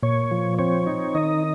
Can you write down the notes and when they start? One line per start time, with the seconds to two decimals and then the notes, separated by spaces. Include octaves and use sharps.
0.03 A#2 C#5
0.31 F3
0.59 C4 C#5
0.87 D#4
1.15 D#3 D#5